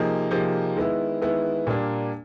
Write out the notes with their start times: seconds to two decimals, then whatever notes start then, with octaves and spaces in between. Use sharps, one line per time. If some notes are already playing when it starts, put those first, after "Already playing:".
Already playing: C3 F3 A#3 D#4 G#4
0.31 C3 F3 A#3 D#4 G#4
0.76 D#3 G#3 B3 E4
1.22 D#3 G#3 B3 E4
1.67 A#2 G3 A#3 D4